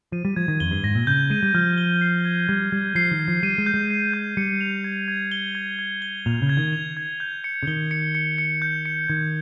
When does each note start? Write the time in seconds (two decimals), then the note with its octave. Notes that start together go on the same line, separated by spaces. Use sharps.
0.12 F3 D#7
0.25 G3
0.36 F3 G#6
0.48 D#3
0.60 F2 G7
0.71 G2
0.84 G#2 A#6
0.95 A#2
1.07 C#3 G6
1.30 G#3 D#7
1.43 G3
1.55 F3 F6
1.78 G7
2.01 C7
2.25 G#6
2.48 G3 G#6
2.72 G3 G#6
2.95 F3 C7
3.11 D#3
3.19 G#6
3.28 F3
3.43 G3 D#7
3.58 G#3
3.66 G6
3.74 G#3
3.91 C7
4.14 G6
4.37 G3 C#7
4.61 F7
4.84 G#6
5.08 G#6
5.32 G7
5.55 G#6
5.79 G#6
6.02 G7
6.26 A#2 F7
6.42 C#3
6.49 G#6
6.57 D#3
6.73 F7
6.97 G#6
7.20 G6
7.44 C#7
7.63 C#3
7.67 D#3 G7
7.91 C#7
8.15 C#7
8.38 C#7
8.62 G6
8.85 C#7
9.08 D#3 G#6